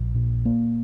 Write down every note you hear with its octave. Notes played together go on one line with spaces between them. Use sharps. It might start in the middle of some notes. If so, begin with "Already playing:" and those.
Already playing: A#1
A#2
A#3